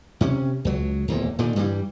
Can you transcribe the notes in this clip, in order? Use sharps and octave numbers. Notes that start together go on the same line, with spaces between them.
C3 C#4
C#2 F#3
D1 E2 A#2
A#2 D3 D#3
G2 E3 G3